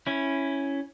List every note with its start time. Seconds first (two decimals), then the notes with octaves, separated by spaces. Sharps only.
0.07 C#4 E4